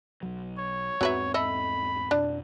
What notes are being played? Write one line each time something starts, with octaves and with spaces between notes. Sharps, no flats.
B1 F#3
C#5
E2 G#2 F#3 C4 B4 E5
A4 D#5 E5 B5
F2 B2 D4